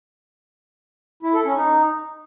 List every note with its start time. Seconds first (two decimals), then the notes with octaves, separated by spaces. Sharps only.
1.23 E4
1.34 A4
1.45 C#4
1.56 D#4